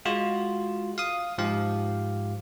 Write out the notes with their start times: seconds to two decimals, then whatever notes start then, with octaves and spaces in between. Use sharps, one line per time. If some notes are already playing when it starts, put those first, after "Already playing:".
0.05 G#3 F4 F#4
0.98 F5 D#6
1.38 G#2 F3 G4 F5